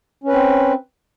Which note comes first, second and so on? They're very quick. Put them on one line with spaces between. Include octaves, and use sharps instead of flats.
C#4 B4 C4